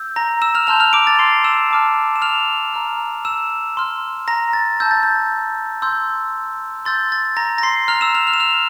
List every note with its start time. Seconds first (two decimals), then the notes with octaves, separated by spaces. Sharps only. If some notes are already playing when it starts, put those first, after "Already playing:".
Already playing: E6 G6
0.16 A#5 A#6
0.42 E6 E7
0.55 F6 F7
0.67 A5 C6 F6 G6 F7
0.80 F6 F7
0.93 D6 D7
1.07 A6
1.19 C6 C7
1.44 E6 E7
1.71 A5 D6 F6
2.16 E7
2.22 F6 F7
2.74 A#5 F6
3.25 E6 E7
3.77 C6 F6
4.28 A#5 A#6
4.53 A6
4.80 A5 E6 G6
4.91 A6
5.03 G6
5.82 C6 E6 G6
6.85 C6 E6 G6 A6
7.12 A6
7.37 A#5 A#6
7.58 A#6
7.63 C6 C7
7.88 A#5 F6 F7
8.01 E6 E7
8.15 F6 F7
8.27 F6 F7
8.33 E7
8.40 F6 F7